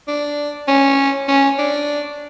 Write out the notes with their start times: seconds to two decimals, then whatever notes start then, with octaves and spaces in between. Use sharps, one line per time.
0.08 D4
0.68 C#4
1.28 C#4
1.59 D4